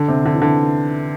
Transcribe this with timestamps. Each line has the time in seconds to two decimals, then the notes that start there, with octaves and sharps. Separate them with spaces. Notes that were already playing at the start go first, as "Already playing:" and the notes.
Already playing: D3
0.08 C3
0.25 D3
0.34 E3
0.42 D3